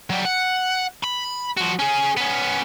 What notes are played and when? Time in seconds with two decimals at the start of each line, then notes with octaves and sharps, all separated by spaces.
0.10 F#3 G3
0.25 F#5
1.03 B5
1.57 F3 F#4
1.79 C#4 G#4
2.17 B3 C#4